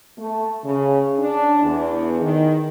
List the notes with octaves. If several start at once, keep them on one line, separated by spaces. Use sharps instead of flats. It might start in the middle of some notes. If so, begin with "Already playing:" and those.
A3
C#3
D4
E2
D#3